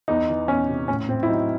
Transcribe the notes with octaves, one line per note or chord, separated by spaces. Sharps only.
E2 D#4
E3
E2 C#4
C3
A2 C#4
A2 C4
E4
F#3 D#4